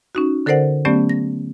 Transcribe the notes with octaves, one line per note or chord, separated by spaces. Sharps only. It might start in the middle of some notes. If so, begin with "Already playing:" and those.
C#4 D#4 F#4
D3 A4 A#4 C5 D5 F#5
F#3 A3 B3 C#4 G4 D5
A#6